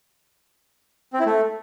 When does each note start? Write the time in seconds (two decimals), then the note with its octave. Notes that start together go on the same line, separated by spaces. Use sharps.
1.13 C4
1.20 E4
1.26 A3